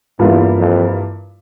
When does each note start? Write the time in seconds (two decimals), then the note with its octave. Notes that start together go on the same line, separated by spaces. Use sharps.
0.19 E2 G2 E3 A#3 F4
0.58 F2